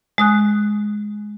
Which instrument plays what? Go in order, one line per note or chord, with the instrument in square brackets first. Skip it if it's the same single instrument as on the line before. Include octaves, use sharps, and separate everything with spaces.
[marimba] G#3 D#6 F#6